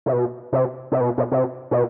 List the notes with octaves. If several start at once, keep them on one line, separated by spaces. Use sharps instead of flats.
C3
B2
C3
C3
B2
B2
C3
B2